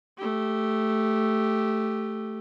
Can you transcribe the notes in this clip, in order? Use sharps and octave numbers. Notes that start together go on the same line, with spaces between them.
A3 G4